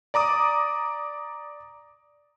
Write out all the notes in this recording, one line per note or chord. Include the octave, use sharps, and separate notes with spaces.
D5 A#5 D6 D#6